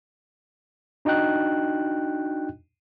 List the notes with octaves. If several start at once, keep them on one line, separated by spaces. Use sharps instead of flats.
D4 D#4 F#4 D#5 G5 F#6